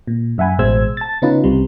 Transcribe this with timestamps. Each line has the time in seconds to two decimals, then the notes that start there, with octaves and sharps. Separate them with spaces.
0.07 A#2
0.38 F#2 E5 F#5 G#5 B5
0.59 A1 B2 G#3 C5 E6 G#6
0.97 A5 A6
1.22 C#3 B3 C#4 D#4 F4 B4
1.44 C2 C3 G3